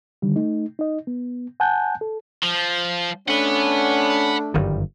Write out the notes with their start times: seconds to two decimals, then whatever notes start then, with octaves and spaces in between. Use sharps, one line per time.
0.22 D3 D#3 G3
0.36 A3 D#4
0.79 D#4 D#5
1.07 B3
1.60 F#5 G#5 A5 F#6 G6
2.01 A4
2.43 F3
3.28 A3 C#4 D4 F#5 B5
4.54 G1 F#2 D#3 G3